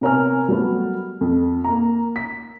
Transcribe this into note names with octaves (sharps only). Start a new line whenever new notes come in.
C3 B3 A#4 C#5 G#5 F6
F#3 G3 A3 B3
F2
A#3 A#5
B6